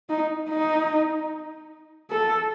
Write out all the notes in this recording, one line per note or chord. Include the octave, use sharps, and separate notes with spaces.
D#4
D#4
A4